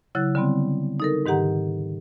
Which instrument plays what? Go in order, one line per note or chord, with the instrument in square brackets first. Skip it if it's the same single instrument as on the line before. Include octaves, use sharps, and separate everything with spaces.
[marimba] C#3 F#3 E4 F#6 A6
D3 G3 B3 C4
D#4 A4 A#4
G#2 D#3 G4 F#5 A#5